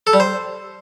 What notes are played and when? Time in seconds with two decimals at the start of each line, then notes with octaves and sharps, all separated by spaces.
0.07 A4
0.13 G3
0.20 C5